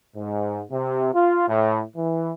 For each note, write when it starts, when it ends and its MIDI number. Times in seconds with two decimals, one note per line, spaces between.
0.16 0.62 44
0.70 1.09 48
1.14 1.47 65
1.48 1.81 45
1.96 2.31 52